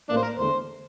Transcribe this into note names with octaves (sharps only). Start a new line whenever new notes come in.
A1 A2 E3 A#3 D4
C5
A#4
E2 D3 A3 C5